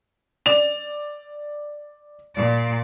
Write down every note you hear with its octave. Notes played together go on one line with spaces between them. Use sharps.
D5 F7
A#2 D5